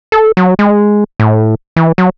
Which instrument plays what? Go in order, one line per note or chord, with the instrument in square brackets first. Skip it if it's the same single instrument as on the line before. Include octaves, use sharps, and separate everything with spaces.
[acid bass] A4
F#3
G#3
A2
E3
F#3